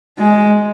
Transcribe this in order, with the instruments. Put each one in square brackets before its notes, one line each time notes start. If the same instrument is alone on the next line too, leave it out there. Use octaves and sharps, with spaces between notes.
[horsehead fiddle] G#3